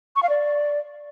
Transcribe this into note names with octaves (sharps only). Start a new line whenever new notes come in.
C#6
F5
D5